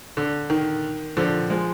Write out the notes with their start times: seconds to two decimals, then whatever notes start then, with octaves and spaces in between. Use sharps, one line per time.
0.17 D3
0.50 D#3
1.17 D3 F3
1.50 F3 G#3